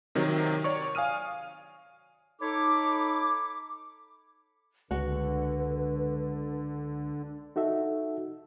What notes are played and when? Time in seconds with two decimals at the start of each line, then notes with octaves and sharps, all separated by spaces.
0.15 C3 D#3 F#3
0.64 C#5 D5 C#6
0.95 F5 G#5 D#6 F6 D#7
2.42 D#4 A4 C#5 B5 D6
4.91 C#2 D3 G#3 F#4 B4 F#5
7.56 D#4 F#4 A4 E5